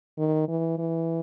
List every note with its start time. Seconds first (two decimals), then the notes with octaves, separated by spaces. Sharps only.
0.18 D#3
0.48 E3
0.78 E3